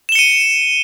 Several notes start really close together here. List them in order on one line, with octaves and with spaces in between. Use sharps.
E7 G7 C#7 D#7